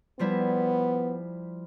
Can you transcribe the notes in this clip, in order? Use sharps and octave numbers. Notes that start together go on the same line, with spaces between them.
F3 G3 B3 E4